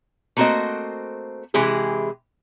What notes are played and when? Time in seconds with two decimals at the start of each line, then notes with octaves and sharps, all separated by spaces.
0.37 A3 A#3 C4 F#4 C5 D#5
1.54 C3 E3 G#3 E4 G4 G#4